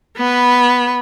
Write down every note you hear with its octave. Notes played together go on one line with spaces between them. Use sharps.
B3 B4